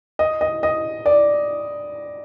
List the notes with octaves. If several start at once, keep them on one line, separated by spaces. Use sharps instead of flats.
D#5
D#5
D#5
D5